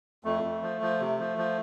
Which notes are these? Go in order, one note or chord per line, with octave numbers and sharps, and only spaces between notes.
F2 A3
F2
F3
F3
C3
F3
F3